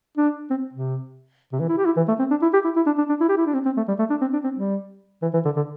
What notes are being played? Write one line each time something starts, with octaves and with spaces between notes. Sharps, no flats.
D4
C4
C3
C3
E3
E4
G4
E4
E3
A3
C4
D4
E4
G4
E4
E4
D4
D4
D4
E4
G4
E4
D4
C4
C4
A3
G3
A3
D4
C4
D4
C4
G3
E3
E3
D3
D3